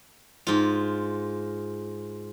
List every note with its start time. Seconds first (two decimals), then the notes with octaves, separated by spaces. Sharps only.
0.47 G#2 F4